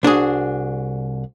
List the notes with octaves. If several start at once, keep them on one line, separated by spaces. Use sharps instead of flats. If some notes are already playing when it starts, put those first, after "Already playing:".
C2 D4 F#4 G#4